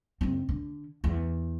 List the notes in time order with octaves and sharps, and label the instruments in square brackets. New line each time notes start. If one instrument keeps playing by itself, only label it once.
[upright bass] F#1 C4
D3
E2